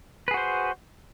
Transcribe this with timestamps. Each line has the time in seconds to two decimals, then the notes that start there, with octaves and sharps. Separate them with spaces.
0.28 B4
0.31 G#4
0.34 F#4
0.37 C5